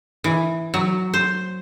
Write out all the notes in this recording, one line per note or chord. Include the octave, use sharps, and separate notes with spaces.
E3
F#3
C5